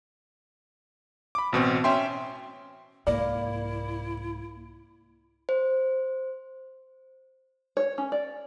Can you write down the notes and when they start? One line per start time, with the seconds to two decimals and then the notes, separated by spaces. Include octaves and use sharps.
1.35 B5 D6
1.53 A1 B2 C4
1.84 C#4 E5 G5 C6
3.07 C2 G#2 A#3 E4 D5
5.49 C5
7.77 C#5
7.98 C#4
8.12 D5